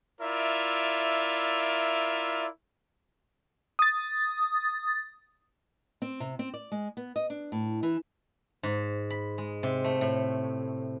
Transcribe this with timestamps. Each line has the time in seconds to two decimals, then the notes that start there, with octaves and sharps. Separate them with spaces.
0.21 E4 F4 A#4 D5 E5
3.79 D#6 A6
6.02 C4
6.20 C3
6.39 C4
6.54 D5
6.72 G#3
6.97 B3
7.16 D#5
7.30 D4
7.52 A2
7.83 E3
8.63 G#2
9.10 B5
9.38 G#3
9.63 C3
9.84 A3
10.01 A2